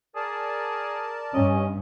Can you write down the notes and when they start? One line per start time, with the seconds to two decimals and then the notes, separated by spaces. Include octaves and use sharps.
0.16 G#4 A#4 D5 A5
1.34 G2 C#4 D#5